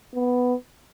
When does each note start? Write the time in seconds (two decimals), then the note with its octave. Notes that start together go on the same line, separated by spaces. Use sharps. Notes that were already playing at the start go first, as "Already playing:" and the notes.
0.15 B3